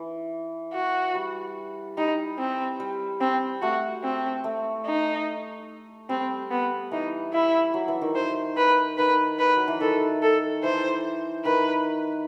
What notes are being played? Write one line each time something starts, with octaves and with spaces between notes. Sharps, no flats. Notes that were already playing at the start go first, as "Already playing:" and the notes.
Already playing: E3
F#4
G3
G3 D#4
C4
G3
C4
A3 F#4
C4
A3
D#4
G3 C4
B3
E3 D#4
E4
F#3
E3
D#3
C5
B4
D#3 B4
B4
F#3
E3
D#3 A4
A4
E3 C5
D#3 B4